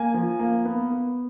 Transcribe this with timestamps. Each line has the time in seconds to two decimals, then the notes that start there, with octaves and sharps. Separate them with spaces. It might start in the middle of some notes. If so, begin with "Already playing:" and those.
Already playing: A#3 G#5
0.14 F3
0.40 A#3
0.65 B3
0.91 B3